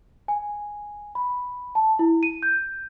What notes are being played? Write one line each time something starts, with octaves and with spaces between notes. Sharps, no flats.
G#5
B5
A5
E4
D#7
G6